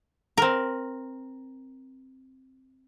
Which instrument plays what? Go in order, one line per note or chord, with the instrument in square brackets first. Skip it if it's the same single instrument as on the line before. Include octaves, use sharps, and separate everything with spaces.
[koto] C4 A#4